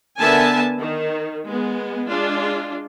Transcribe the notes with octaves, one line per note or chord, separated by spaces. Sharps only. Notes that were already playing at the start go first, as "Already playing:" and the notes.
D3 B3 A#4 E5 G#5 A5
D#3
G#3 B3
G#3 D4 F4